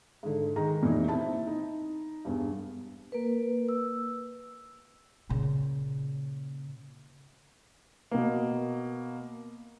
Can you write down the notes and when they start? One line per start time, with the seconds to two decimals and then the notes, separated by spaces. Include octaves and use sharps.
0.23 G#2 D3
0.56 D#3 G#3 A#5
0.82 F1 A#2 E3 D#4
1.08 C4 E4 E5 A5 B5
1.47 D#4
2.25 E1 G2
3.12 A#3 A#4 B4
3.69 E6
5.29 A#2 C#3
8.11 B2 A#3